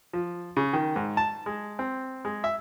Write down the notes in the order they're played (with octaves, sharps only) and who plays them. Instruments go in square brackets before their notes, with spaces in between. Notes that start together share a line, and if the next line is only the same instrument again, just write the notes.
[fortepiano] F3
C#3
D#3
G#2
A5
G#3
C4
G#3
E5